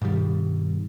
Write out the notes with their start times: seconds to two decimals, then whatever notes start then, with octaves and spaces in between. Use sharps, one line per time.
0.02 G2 B2 D#3 G3